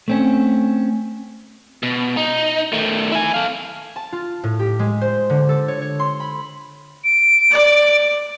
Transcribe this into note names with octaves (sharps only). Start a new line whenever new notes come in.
A3 C4 C#4
B2
D#4
D#3 A3
E4 G#5
A4 F5
A5
F4
A2
G4
G#3
C5
D3
A4
C#5
C#5
C6
B5
D7
D5